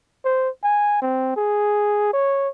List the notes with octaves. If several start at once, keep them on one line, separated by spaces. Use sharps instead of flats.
C5
G#5
C4
G#4
C#5